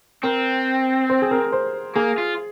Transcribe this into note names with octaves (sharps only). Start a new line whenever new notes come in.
C4 A#4
C5
G#4
A#4
C5
A#3 G#4
F4